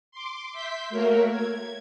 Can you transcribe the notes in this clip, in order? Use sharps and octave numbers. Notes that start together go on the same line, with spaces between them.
C6 D6
E5 C6 G6 B6
A3 A#3 F#4 A#4 C#5 E5
G#6